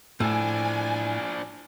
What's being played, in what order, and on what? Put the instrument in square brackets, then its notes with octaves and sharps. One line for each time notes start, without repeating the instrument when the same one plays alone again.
[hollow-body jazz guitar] A2 [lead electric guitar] F3 D4 [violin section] G#5